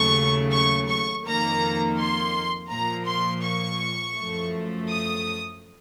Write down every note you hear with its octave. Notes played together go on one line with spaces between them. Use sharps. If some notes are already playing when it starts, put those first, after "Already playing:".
Already playing: D#2 C#3 F#3 A3 C#6
C#6
C#6
F2 D#3 A#3 A#5
C6
A#2 F3 A#3 A#5
C6
C#6
F#2 F3 A3
D#6